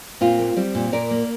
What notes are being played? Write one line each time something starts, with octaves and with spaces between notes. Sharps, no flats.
A#2 C4 F4
A#3
G3 C4
A#2
A#2 A#4 D5
A#3